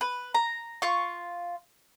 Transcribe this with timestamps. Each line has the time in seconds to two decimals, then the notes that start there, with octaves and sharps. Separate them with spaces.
0.01 B4
0.35 A#5
0.82 F4 C#6